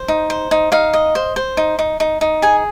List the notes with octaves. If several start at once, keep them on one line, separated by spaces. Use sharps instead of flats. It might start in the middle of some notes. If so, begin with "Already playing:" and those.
Already playing: C5
D#4
C5
D#4
D#4 F5
D#5
C5
C5
D#4
D#4
D#4
D#4
G#4 G#5